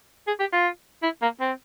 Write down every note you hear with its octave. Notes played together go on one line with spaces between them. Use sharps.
G#4
G4
F4
E4
A#3
C4